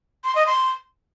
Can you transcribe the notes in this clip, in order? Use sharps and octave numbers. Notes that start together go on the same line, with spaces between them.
C6
D#5
C6